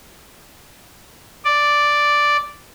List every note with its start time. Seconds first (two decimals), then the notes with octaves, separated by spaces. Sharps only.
1.45 D5